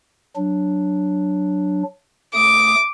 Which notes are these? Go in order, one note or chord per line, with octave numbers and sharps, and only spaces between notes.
F#3 D4
A3 D6 D#6